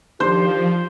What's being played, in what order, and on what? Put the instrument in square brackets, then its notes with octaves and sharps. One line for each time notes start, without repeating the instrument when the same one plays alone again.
[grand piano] D#3 D4 [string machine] F3 [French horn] G4 [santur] C5